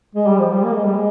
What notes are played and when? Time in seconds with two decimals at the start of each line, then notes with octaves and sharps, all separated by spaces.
0.15 G#3
0.27 G3
0.39 F3
0.51 G3
0.63 A#3
0.74 G#3
0.85 G3
0.95 G#3